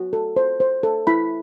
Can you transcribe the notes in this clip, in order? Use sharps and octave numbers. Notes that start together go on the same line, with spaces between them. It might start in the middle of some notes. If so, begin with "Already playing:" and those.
Already playing: F#4
A4
C5
C5
A4
E4 B5